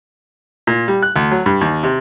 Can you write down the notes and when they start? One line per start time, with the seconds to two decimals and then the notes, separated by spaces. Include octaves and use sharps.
0.67 A#2
0.88 G3
1.03 F#6
1.16 D2
1.31 F#3
1.46 G2
1.61 D#2
1.83 C3